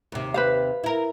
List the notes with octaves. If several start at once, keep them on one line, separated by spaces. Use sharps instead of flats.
D#2 C3
B4 C5 F5
E4 A#4